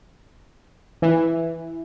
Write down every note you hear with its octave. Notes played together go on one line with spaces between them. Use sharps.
E3